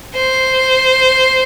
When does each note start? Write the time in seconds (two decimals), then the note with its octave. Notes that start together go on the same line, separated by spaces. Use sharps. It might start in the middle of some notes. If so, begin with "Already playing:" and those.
0.15 C5